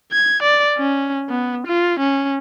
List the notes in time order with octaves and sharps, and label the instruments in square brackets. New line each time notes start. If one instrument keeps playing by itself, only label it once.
[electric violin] G#6
D5
C#4
B3
F4
C#4